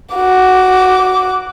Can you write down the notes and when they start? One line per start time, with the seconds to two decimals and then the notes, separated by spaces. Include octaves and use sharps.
0.15 F#4 D6